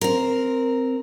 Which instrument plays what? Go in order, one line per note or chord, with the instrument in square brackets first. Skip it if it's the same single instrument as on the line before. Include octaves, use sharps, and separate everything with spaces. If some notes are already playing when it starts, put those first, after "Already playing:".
[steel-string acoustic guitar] C4 A#4